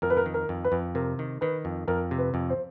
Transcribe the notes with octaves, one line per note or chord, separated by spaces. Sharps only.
F2 A#4
B4
A#4
D#3
A#4
F2
B4
F2
C3 A#4
D#3
D#3 B4
F2
F2 A#4
C3
B4
F2
C5